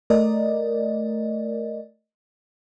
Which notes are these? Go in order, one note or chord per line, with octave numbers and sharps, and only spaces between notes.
A3 A#4 D5 D#5